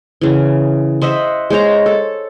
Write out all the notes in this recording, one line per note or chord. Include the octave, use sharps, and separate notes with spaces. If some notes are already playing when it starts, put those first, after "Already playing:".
C#3 E3
C5 D#5 E5 F#5
G#3 C5 C#5 A#5
A4